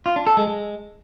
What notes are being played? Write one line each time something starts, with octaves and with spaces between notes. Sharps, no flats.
F4
D4
A4
G#3
G#3